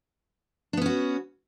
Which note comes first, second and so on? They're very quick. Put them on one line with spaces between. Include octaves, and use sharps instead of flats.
D4 B3 C#4 F#4